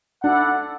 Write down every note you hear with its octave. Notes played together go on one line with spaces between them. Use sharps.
D4 E4 A4 D5 F#5